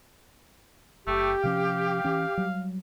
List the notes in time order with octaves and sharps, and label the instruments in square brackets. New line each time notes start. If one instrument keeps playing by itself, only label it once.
[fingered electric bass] F#1 [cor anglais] A3 [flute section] G4
[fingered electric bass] C3 F3 C#4 [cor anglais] F5
[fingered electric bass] E3 C#4
F#3 G3